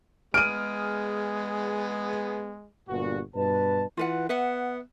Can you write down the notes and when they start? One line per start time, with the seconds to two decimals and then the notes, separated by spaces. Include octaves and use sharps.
0.34 G#3 B3 G#4 F6 D7 D#7
2.89 G1 G2 A#2 F#4
3.35 G2 B2 B4 A5
3.97 E3 F4 B4 F#5
4.29 B3 B4 E5 F#5